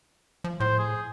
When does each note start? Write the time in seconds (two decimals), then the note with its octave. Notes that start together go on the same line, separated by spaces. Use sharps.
0.44 F3
0.60 A2 C5
0.79 G#4